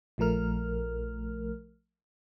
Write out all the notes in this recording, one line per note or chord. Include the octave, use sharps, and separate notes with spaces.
A#1 F3 A3 A#4 F6